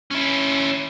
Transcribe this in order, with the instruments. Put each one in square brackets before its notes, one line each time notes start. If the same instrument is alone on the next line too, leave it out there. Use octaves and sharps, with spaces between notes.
[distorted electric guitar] C#4 E4